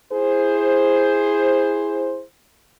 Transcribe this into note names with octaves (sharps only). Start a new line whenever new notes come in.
E4 G#4 C5